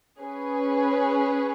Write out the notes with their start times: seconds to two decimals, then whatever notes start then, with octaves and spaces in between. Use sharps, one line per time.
0.19 C#4 G#4 B4